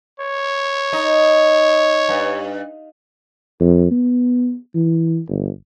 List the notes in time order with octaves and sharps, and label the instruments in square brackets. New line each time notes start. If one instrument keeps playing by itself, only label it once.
[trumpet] C#5
[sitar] D#4
G2
[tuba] F2
B3
E3
G1